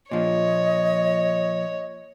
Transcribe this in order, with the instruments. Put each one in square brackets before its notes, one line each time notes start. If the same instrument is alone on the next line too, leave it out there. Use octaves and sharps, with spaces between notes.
[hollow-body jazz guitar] A#2 F3 [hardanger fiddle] C#5 [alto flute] D#5